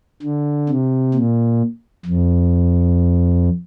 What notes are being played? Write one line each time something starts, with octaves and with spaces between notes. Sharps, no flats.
D3
C3
A#2
F2